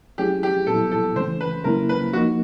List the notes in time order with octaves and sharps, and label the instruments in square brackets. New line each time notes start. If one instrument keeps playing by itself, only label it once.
[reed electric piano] F#3 A3 C#4 E4 G#4 [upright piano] G4
[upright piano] G4
[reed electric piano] A#2 F#3 B3 E4 [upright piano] A4
[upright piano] A4
[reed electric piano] C#3 E3 A3 C#4 [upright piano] C5
[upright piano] B4
[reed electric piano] C#3 F#3 A#3 C#4 E4 [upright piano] A#4
[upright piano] B4
[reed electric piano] F3 A#3 D#4 [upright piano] F#4